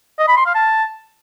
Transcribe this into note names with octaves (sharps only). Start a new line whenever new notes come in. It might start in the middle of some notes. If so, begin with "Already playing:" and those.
D#5
B5
C6
F5
A5